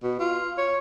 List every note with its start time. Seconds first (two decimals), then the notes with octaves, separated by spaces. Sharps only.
0.03 B2
0.20 F4
0.58 C#5